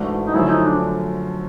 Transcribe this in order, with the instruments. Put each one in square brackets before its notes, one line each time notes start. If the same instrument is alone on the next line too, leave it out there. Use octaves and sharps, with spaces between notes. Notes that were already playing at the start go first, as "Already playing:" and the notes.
Already playing: [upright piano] G#2 E3 A3 D4 F#4
[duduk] D#4
[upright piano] F#2 D3 F3 A3 [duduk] E4
[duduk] D#4
D4